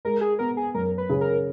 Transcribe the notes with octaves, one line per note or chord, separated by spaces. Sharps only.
G#3 A#4
G#4
B3 A#4
G#4
F#2 A#4
B4
C#3
A#4